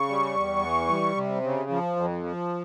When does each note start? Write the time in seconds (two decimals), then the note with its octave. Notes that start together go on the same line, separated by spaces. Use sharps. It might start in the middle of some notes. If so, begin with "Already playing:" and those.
Already playing: C#3 C#6
0.08 G3
0.35 E2
0.62 E3
0.89 G3
1.16 C3
1.43 C#3
1.70 F3
1.96 F2
2.23 F3